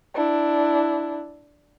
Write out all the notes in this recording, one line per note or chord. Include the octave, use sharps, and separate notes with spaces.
D4 E4